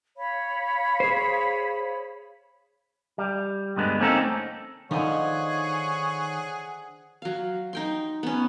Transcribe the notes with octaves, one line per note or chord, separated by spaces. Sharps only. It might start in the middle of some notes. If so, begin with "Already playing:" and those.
C#5 F5 B5
G#4 C5
G3
D2 G2 D3 G#3 B3
A3 A#3 C4 C#4 D#4 A4
D3 D#3 F3 D#4 G#4 C#5 D#5 F#5
F#3 F5
D#4 G5 C6
B3 C#4